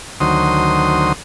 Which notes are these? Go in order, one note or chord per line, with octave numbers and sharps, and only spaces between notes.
D2 D#3 F#3 C5 C6 D#6